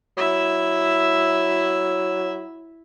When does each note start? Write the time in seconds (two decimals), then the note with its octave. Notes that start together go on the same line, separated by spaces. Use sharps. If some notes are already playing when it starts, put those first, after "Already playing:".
0.17 F#3 E4 E5